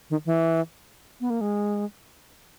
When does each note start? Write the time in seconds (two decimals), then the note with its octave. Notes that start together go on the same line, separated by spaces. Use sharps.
0.10 D#3
0.26 E3
1.21 B3
1.30 A#3
1.41 G#3